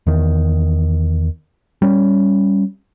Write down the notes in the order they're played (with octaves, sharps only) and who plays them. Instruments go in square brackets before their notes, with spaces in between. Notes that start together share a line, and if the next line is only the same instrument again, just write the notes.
[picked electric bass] E2 D#3
G3 C#4